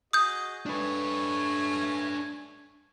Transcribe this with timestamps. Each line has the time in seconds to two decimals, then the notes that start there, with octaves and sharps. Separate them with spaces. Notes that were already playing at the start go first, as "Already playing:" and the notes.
0.13 F#4 G#4 D#5 D#6 G6
0.66 A3 D4 B4 C#5 G#5